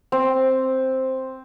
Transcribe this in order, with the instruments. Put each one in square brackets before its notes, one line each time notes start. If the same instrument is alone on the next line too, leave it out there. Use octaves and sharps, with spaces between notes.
[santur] C4